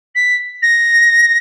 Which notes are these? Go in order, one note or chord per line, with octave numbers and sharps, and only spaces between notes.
B6
A#6